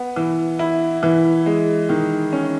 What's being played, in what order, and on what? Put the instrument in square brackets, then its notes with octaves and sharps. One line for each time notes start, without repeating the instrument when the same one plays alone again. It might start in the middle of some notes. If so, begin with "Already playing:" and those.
Already playing: [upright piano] B3
E3
E4
E3
G#3
D#3
C#4